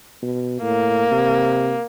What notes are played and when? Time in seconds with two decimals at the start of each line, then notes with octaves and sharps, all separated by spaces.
0.22 B2
0.62 A2 A#3
1.11 C3